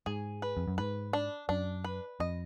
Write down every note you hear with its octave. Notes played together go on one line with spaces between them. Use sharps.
G#2 G#4
B4
F2
F#2
G#2 B4
D4
F#2 D4
B4
F2 D#5